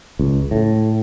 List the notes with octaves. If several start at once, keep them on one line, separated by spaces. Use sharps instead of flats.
C#2
A2